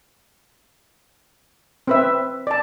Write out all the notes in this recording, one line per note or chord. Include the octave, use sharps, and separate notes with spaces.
C4 B4 E5
D5 A5